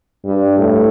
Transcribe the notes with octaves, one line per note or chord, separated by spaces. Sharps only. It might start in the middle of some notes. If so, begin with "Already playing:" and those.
G2
A2